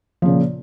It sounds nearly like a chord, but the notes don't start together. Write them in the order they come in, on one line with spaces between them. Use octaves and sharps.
F3 C#3 A#2